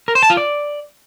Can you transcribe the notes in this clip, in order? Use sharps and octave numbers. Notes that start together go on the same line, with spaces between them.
A#4
C5
A5
F4
D5